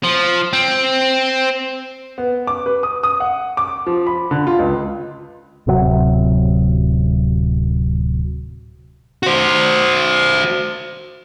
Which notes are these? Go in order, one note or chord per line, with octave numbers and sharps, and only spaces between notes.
F3
C4
B3
D6
B4
D#6
D#6
F#5
D6
F3
B5
D3
F4
C#2
D1 C3 F#3
F#4 C5